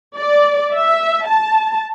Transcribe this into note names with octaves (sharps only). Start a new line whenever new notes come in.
D5
E5
A5